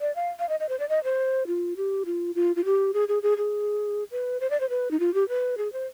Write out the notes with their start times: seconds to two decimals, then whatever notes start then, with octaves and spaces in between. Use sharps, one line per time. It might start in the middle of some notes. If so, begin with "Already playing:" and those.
0.01 D5
0.16 F5
0.39 F5
0.49 D#5
0.60 D#5
0.69 C5
0.79 D5
0.89 D#5
1.04 C5
1.47 F4
1.77 G4
2.06 F4
2.35 F4
2.56 F4
2.65 G4
2.94 G#4
3.08 G#4
3.23 G#4
3.38 G#4
4.11 B4
4.41 C5
4.50 D5
4.60 C5
4.70 B4
4.91 D#4
5.00 F4
5.14 G4
5.29 B4
5.58 G#4
5.73 C5